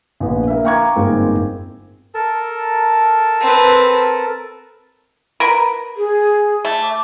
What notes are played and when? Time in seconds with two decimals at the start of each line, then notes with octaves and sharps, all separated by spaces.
0.20 A#1 B3
0.48 A#3 E5
0.65 F5 G5 A#5 C#6 D6 G#6
0.95 G1 G#2 G#3 A#3 C4
2.14 A4 A#4 A5
3.40 C4 B4
5.40 A#4 B4
5.97 G#4
6.65 A3
6.83 D6